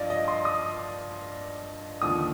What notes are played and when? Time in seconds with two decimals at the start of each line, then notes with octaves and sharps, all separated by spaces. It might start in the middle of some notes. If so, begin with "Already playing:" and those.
Already playing: G2 F3 D5 D#5 F5
0.10 D#5
0.28 C6
0.45 D#6
2.02 D#2 D3 F3 D#6